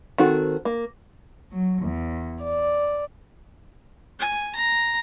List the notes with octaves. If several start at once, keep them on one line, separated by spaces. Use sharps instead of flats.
D#3 C4 F#4 A4
A#3
F#3
E2
D5
G#5
A#5